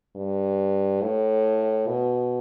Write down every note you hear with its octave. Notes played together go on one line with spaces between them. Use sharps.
G2
A2
B2